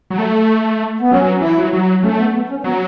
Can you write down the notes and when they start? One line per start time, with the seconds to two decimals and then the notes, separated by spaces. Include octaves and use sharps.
0.10 F#3
0.18 A3
1.00 B3
1.11 F#3 C#4
1.41 E3 E4
1.57 F#3
1.73 F#3
2.03 A3 C#4
2.19 B3
2.34 B3
2.50 C#4
2.64 F#3 B3